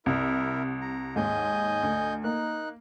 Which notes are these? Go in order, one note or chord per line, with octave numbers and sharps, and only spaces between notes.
C2 E4 A#4
A#5
D#2 G#2 D#5 G#5 G6
D2
A#3 D#4 F#6